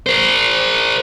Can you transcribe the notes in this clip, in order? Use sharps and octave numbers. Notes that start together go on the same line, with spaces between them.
A#4 C5